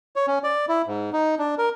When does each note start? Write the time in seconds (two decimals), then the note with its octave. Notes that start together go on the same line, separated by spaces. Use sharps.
0.16 C#5
0.28 C#4
0.44 D5
0.69 E4
0.87 G#2
1.13 D#4
1.39 D4
1.58 A#4